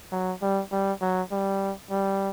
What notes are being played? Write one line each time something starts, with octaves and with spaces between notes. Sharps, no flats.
F#3
G3
G3
F#3
G3
G3